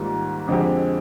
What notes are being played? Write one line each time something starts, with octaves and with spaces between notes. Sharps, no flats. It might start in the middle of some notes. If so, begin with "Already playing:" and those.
Already playing: G#2 D#3 G3 A#3 F4
F2 D3 G#3 C4 G4